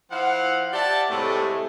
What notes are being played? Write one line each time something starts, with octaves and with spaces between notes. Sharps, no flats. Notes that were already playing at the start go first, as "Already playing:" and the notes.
F3 E4 F5 F#5
G4 D5 E5 F#5 A5
A2 C3 G#3 A3